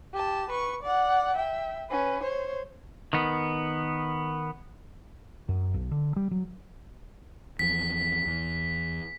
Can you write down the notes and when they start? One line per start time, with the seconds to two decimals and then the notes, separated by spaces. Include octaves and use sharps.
0.13 G4 A5
0.50 B4 C#6
0.83 D5 F#5
1.37 E5 G5
1.90 C#4 B4
2.22 C5 C#5
3.13 D#3 B3
5.49 F#2
5.74 B1
5.91 D3
6.16 G3
6.31 F#3
7.59 E2 F3 B6
8.26 E2